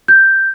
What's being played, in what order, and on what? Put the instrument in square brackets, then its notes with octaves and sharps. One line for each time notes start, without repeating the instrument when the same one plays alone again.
[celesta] G6